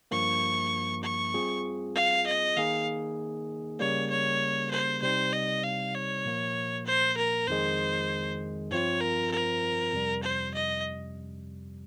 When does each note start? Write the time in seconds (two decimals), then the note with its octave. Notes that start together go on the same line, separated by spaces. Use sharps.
0.11 G2 F3 A#3 C#6
1.03 C#6
1.34 G3 C4 F4 G#4
1.95 F5
2.26 D#5
2.57 D#3 A#3 D#4 G#4 F5
3.79 C#3 G3 A#3 C#5
4.10 C#5
4.71 C5
5.02 C3 G3 C4 D#4 C5
5.32 D#5
5.63 F5
5.94 C#5
6.25 A#2 F3 A#3
6.86 C5
7.17 A#4
7.47 F2 D#3 G#3 C5
8.70 G2 F3 C4 F4 C#5
9.01 A#4
9.31 A#4
9.93 F2 C3 G3
10.23 C5
10.54 D#5